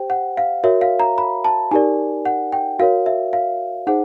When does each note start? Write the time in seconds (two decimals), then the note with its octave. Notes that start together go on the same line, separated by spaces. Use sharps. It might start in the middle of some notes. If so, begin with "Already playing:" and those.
Already playing: G4 C5 G5
0.10 F#5
0.37 F5
0.64 F#4 A#4 C#5 E5
0.81 F5
1.00 A#5
1.18 B5
1.45 A5
1.71 D#4 G4 A#4 D5 G#5
2.25 F#5
2.52 G5
2.79 F#4 A#4 C#5 F5
3.06 E5
3.33 F5
3.87 D#4 G#4 C5 F#5